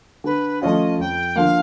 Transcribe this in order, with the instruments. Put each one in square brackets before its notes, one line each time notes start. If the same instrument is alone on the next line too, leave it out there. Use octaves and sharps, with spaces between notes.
[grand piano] D3 [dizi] B4
[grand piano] F3 A3 C#4 F4 [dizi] D#5
[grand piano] F2 [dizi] G5
[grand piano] D3 F3 A#3 [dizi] F5